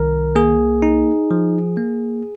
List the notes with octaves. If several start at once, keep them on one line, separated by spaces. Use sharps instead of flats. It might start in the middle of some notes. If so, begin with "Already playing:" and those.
Already playing: C2 D#3 A#4
A#3 G#4
D#4
F3
A#3